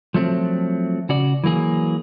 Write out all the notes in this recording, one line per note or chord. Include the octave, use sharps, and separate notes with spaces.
F3 F#3 A3 C4
C#3 F#4 D5
E3 F#3 A#3 G#4